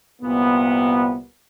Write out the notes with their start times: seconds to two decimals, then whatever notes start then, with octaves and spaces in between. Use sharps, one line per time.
0.22 C2 A#2 B3